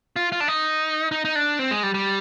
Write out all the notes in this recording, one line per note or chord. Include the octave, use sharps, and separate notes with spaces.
F4
F4
D4
D#4
D#4
D#4
D4
C4
G#3
G3
G3